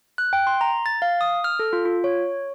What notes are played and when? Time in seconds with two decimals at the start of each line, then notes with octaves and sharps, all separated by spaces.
0.18 F#6
0.33 G5
0.47 C6
0.61 A#5
0.86 A6
1.02 F5
1.21 D#6
1.44 F6
1.59 A4
1.73 F4
1.85 F4
2.04 C#5